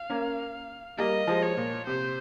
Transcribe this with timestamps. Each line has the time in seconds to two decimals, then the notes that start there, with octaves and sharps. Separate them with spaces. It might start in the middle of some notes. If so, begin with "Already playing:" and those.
Already playing: F5
0.10 A#3 C#4
0.98 G3 A#3 D#5
1.27 F3 G#3
1.43 C#5
1.57 A#2
1.87 C3 C5